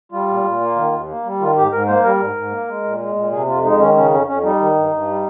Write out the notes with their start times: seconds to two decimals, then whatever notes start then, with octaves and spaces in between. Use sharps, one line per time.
0.12 G3 F4
0.28 A#2
0.44 A#2
0.60 A#3
0.76 D#3
0.92 D#2
1.08 A#3
1.24 G3
1.40 D#3 F4
1.56 G#2 G4
1.72 G#2 A#4
1.88 A#3 C5
2.04 G3 A#4
2.20 G#2
2.36 G#2
2.52 A#3
2.68 G#3
2.84 A#2
3.00 G#3
3.16 A#2
3.31 C3 G#4
3.48 F2 F4
3.64 G#3 D#4
3.79 D#3 C#4
3.96 C#3 C#4
4.11 F2 C#4
4.28 F2 C#4
4.43 G3 D#4
4.59 D#3
4.75 G2
4.92 G2
5.07 G3